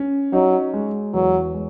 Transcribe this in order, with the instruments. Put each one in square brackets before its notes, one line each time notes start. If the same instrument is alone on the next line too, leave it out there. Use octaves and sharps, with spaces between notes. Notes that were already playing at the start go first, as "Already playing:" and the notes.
Already playing: [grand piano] C#4
[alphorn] F#3 [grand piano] D#4
[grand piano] G#3
[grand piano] E2 [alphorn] F#3
[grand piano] G#3